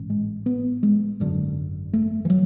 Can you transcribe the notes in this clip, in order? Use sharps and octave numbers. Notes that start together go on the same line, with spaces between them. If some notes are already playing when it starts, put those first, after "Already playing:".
Already playing: A1 G#2
G#3
B3
G#3
G#1 F#2 D3
A3
E3
F#3